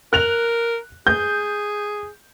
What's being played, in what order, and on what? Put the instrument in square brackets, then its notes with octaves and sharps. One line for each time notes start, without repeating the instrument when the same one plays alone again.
[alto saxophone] A#4 [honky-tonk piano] F#6 F7
[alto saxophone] G#4 [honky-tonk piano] G6